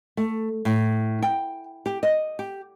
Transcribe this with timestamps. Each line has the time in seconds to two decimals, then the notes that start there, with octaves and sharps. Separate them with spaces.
0.17 A3
0.65 A2
1.22 G5
1.86 G4
2.03 D#5
2.39 G4